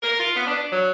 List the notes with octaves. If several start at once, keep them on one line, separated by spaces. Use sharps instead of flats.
A#4
F4
B3
D4
F#3